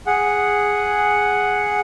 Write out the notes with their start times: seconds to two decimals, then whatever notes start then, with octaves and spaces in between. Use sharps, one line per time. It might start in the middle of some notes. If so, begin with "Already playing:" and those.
0.07 G#4 F#5